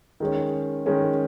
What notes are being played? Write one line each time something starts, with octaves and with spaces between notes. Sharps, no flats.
D#3 G#3 C#4
D#3 G#3 C#4